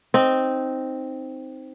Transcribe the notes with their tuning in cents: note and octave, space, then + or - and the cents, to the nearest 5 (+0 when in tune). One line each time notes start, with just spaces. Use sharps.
C4 +0 D#4 +0